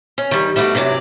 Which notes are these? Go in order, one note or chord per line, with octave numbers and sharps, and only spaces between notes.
C#4
D#3 G3
G3 A3 B3 F#4 D5
C3 E3 F#3 D5